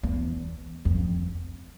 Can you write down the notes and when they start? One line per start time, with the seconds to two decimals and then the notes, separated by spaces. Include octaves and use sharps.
0.03 E2
0.85 F2